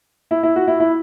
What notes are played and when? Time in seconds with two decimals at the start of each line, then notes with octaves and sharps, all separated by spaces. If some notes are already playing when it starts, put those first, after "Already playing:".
0.31 E4
0.43 E4
0.56 F#4
0.68 E4
0.80 E4